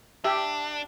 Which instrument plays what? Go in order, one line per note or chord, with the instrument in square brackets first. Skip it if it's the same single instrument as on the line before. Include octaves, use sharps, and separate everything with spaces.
[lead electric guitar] D4 [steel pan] G4 E5